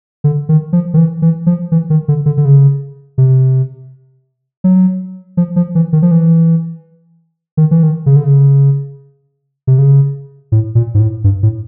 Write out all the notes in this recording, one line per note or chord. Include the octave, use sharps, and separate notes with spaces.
D3
D#3
F3
D#3
E3
E3
F3
E3
D#3
D3
D3
D3
C#3
C3
F#3
F3
F3
E3
D#3
F3
E3
D#3
E3
D#3
C#3
D3
C#3
C3
C#3
A2
A#2
G#2
A2
G2
A2